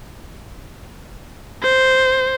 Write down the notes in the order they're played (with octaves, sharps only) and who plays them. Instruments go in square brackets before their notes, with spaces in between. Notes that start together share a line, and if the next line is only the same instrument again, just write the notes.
[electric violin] C5